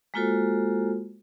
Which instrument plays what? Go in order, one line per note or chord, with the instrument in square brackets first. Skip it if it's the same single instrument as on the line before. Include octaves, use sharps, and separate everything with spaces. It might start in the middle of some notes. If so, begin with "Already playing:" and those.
[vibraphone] G#3 A#3 F4 F#4 A4 C5